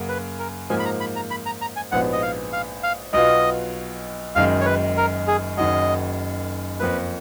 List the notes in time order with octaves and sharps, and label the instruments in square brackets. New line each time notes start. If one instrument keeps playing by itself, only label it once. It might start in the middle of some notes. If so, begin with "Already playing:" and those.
Already playing: [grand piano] F#2 C#3 F#3 A#3
[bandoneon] B4
A#4
[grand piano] G#2 F3 A#3 [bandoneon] G#5
[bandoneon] B5
A#5
B5
A#5
B5
A#5
A#5
G#5
[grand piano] A#1 G#2 F3 B3 F#4 [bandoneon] F#5
[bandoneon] D#5
F5
F5
F5
[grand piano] B1 B2 F#3 B3 F4 [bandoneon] D#5
[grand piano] F#1 F#2 D#3 G#3 [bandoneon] F5
[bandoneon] C#5
B4
A#4
G#4
[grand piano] F#1 F#2 D#3 F#3 [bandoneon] D#5
[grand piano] F2 F3 A#3 [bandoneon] B4